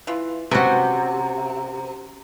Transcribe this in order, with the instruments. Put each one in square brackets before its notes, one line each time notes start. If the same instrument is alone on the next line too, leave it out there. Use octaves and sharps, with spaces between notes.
[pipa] E3 F4
[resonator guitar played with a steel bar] C3 [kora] C#4 F#4 [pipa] B4 C5